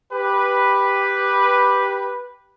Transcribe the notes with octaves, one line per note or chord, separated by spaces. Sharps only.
G4 B4